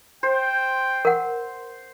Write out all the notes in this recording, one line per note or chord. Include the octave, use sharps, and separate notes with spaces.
C5 G5
A#4 F#5